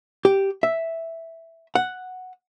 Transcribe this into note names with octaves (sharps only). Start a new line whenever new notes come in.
G4
E5
F#5